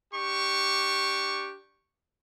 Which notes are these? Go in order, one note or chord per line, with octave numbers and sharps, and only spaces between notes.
D4 G4 C#6